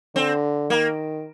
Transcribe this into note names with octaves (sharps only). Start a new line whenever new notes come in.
D3 C4
D#3 A#3